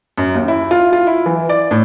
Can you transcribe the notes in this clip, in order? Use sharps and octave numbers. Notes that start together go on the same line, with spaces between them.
F#2
D#2
E4
F4
F4
E4
E3
D5
A2